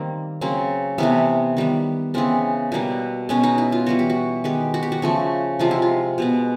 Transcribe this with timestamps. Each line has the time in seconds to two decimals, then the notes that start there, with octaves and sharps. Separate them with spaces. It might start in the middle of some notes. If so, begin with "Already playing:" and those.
Already playing: D#3 G3 A#3 C4
0.41 C#3 F#3 A#3 C4
0.98 C3 E3 A3 B3
1.57 D#3 G3 B3
2.14 C#3 E3 G#3 B3 C4
2.72 B2 G3 A#3
3.29 B2 G#3 B3 C#4
3.43 D#4
3.58 E4
3.72 F4
3.86 E3 G3 B3 F#4
3.99 G4
4.10 F#4
4.44 D#3 G#3 B3 G4
4.74 F#4
4.83 G4
4.92 F#4
5.02 C#3 F3 A3
5.59 C3 F3 G#3 F4
5.71 E4
5.82 F4
6.18 B2 G#3 B3